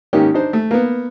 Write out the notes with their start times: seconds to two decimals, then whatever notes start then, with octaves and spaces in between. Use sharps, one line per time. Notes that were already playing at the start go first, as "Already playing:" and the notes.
0.13 G#2 D#3 A#3 C#4 G4
0.34 D4 D#4 C5
0.53 A3
0.71 A#3 B3